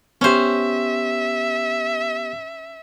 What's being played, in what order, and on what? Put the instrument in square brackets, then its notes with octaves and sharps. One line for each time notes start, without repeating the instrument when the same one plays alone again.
[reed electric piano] B3 G4 [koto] C#4 C5 [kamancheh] E5